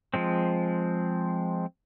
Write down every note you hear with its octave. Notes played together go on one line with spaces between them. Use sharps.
F3 G#3 C4